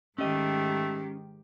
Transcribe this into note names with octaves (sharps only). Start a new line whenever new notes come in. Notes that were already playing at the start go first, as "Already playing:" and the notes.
G#2 D#3 A3 C#4 G4 D#5